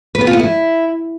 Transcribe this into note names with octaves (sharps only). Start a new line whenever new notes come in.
B4
B3
F4
B3
E4